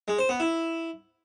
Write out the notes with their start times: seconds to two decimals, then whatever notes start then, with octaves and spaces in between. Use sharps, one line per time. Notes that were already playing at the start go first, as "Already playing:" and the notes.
0.08 G#3
0.19 C5
0.29 B3
0.40 E4